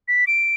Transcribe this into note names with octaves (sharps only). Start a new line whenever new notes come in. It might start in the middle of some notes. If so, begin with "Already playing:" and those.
B6
D7